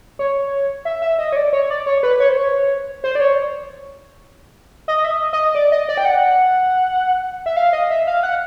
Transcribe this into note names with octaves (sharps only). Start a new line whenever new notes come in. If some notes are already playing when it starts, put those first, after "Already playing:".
C#5
E5
E5
D#5
C#5
D5
C#5
D5
C#5
B4
C#5
C5
C#5
C5
D5
C#5
D#5
E5
D#5
D#5
D5
D#5
D5
G5
F#5
E5
F5
D#5
E5
F5
F#5